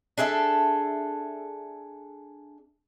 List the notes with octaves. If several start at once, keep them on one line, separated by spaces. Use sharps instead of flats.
D4 G#4 A4 E5